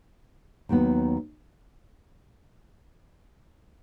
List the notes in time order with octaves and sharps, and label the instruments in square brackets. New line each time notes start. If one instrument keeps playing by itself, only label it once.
[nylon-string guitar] D#2 D#3 F#3 B3